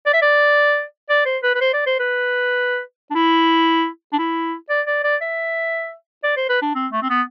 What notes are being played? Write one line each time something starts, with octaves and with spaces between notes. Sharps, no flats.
D5
E5
D5
D5
C5
B4
B4
C5
D5
C5
B4
D4
E4
D4
E4
D5
D5
D5
E5
D5
C5
B4
D4
C4
A3
C4
B3